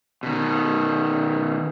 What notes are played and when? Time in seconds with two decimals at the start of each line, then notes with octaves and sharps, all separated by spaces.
0.23 B2 D#3